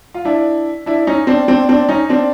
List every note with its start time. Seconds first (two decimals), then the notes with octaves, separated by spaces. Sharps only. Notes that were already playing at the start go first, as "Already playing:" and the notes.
0.14 F4
0.25 D4 E4
0.86 D4 E4
1.07 C#4 D#4
1.27 C4 D4
1.48 C4 D4
1.69 C4 D4
1.89 C#4 D#4
2.09 C4 D4